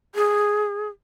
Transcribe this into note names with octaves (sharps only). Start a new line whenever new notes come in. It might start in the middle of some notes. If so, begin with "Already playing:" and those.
G#4